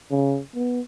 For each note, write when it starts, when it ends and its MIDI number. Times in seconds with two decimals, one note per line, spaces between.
0.11 0.40 49
0.55 0.80 59